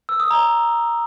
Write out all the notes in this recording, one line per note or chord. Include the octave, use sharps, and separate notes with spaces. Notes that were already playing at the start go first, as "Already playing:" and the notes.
E6
D#6
A#5